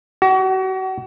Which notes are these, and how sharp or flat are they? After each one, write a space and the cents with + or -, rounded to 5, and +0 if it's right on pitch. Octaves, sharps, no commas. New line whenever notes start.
F#4 +35